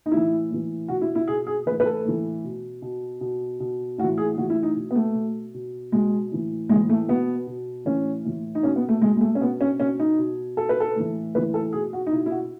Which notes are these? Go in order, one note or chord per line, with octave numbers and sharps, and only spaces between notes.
D#4
A2 E3 E4
A2 E3
B2 F#4
E4
E4
B2 G#4
G#4
A2 E3 B4
B4
A4
A2 E3
B2
B2
B2
B2
A2 F#4
E3
G#4
A2 E3 F#4
E4
D#4
B2
B3
A3
B2
B2
B2 G#3
A2 E3
A2 G#3
E3
A3
B2 B3
B2
A2 E3 C#4
A2 E3
D#4
B2 C#4
B3
A3
B2 G#3
G#3
A3
C#4
B2 B3
C#4
B2 C#4
D#4
B2
B2 A4
B4
A4
A2 E3
A2 E3 B4
A4
B2 G#4
F#4
D#4
B2 E4
E4
F#4